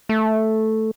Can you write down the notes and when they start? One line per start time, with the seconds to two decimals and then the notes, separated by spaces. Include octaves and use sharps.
0.09 A3